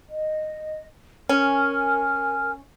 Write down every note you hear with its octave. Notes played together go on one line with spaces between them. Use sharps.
D#5
C#4 A#4 G#5 F6